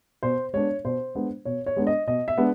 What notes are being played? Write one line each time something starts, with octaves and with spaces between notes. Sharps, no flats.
B2 C5
G#3 B3 D4 C#5
B2 C5
G#3 B3 D4
B2 C#5
C#5
G#3 B3 D4
D#5
B2 D#5
E5
G#3 B3 D4